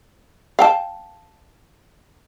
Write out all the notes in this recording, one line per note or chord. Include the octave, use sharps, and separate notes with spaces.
F5 G5 A5